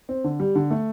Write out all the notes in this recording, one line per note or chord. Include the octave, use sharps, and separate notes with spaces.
C4
D3
G3
D3
A3